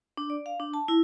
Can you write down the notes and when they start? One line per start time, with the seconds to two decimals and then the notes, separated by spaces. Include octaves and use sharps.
0.17 D4
0.30 D5
0.46 F5
0.60 D4
0.74 A5
0.88 E4